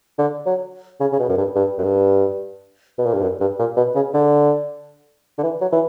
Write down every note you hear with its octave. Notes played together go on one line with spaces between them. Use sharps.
D3
F#3
C#3
C#3
B2
F#2
G2
G2
F#2
G2
B2
A#2
G2
F#2
G2
A#2
B2
C#3
D3
D3
E3
F#3
E3